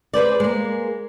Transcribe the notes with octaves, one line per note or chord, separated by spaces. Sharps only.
G#4 B4 C5 D5
G#3 A#3